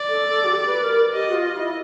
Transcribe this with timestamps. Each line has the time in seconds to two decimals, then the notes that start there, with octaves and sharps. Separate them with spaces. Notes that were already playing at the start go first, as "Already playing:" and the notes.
Already playing: D5
0.09 A4
0.29 A4
0.44 F#4
0.50 G4
0.66 B4
0.82 A#4
1.13 G4 D#5
1.28 F#4
1.33 F4
1.45 D#5
1.54 E4